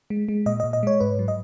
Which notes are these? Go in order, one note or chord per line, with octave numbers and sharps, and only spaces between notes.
G#3
G#3
A#2 D#5
A#2 D#5
D#5
G#3 C#5
G#2 B4
F#3
D#5